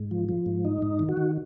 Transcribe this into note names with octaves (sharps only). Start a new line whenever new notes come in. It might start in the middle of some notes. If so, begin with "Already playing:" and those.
Already playing: G#2
F3
F3
G#2
D#4
G#2
D#3
F#4
D#3